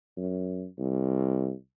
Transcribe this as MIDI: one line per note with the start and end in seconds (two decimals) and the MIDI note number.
0.17 0.65 42
0.79 1.52 36